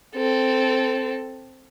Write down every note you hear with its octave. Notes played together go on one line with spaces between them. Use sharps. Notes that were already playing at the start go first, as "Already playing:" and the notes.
C4 A4